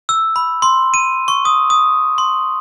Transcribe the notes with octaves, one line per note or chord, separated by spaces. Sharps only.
E6
B5
C6
D#7
C#6
D#6
D#6
C6